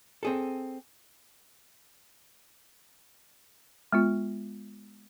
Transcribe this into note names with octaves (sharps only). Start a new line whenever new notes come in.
C4 G#4 A4
G#3 B3 F4